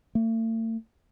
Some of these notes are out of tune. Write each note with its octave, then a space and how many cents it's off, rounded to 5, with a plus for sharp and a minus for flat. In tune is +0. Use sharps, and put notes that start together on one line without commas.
A3 +40